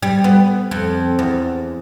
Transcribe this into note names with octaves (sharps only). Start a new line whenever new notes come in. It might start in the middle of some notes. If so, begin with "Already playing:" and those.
G3
B3
F2
E2